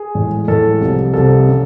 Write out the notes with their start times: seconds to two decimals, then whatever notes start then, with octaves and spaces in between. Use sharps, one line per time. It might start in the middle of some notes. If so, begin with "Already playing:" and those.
Already playing: G#4
0.15 A2 E3 G#3
0.48 A2 E3 G#3 A4
0.81 C2 C3 F3
1.14 C2 C3 F3 A4
1.48 C#3 F3